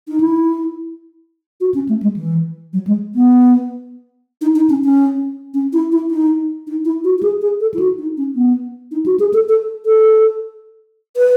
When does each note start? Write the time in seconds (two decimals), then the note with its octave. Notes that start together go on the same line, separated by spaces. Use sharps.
0.08 D#4
0.20 E4
1.60 F#4
1.74 C#4
1.89 A3
2.03 G#3
2.16 E3
2.73 F#3
2.87 G#3
3.15 B3
4.42 D#4
4.56 D#4
4.70 C#4
4.84 C#4
5.54 C#4
5.73 E4
5.92 E4
6.11 D#4
6.67 D#4
6.85 E4
7.04 F#4
7.19 F#4
7.23 G#4
7.42 G#4
7.61 A4
7.74 E4
7.79 F#4
7.98 D#4
8.17 C#4
8.35 B3
8.92 D#4
9.06 F#4
9.20 G#4
9.34 A4
9.48 A4
9.86 A4
11.17 B4